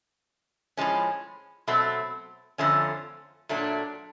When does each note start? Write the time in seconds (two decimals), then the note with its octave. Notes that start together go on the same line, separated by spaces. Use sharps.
0.77 A2 F3 G#3 C#4
1.67 B2 F#3 A3 C4
2.58 F2 D3 F3 A3 C#4
3.49 A#2 F#3 A3 D4